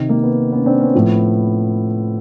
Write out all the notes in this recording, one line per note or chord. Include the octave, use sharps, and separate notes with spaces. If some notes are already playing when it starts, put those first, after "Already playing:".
Already playing: C3 D#3
A#3
B3
B3 C#4
C4 D4
B3 C#4
A2 F3 B3